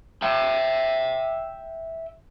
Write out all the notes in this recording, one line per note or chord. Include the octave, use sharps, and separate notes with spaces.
E5 G5